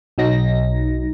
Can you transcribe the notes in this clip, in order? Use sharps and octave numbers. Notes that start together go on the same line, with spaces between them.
B1 F#3 D#4 A#6